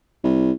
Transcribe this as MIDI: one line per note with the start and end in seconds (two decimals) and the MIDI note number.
0.24 0.52 36